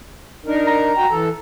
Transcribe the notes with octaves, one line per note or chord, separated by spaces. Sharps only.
D4 D#4 A#4
A#5
F#4 G5
E3 A4